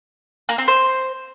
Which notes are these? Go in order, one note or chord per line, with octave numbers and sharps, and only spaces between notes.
A#3
C4
C5